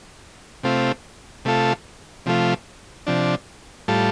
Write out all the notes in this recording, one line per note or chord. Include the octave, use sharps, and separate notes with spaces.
C3 A3 C4 F4
C3 A3 F4 A4
C3 F3 A3 F4
C3 F3 D4
A2 G3 F4 A4